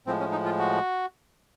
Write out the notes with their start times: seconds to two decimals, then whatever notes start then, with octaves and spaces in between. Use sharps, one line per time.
0.06 A2 F3 G#3 C4
0.20 C#4
0.32 D#4
0.45 F4
0.59 F#4